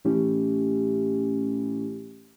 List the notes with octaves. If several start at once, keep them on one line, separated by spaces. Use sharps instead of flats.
A2 E3 A3 C#4 E4 G4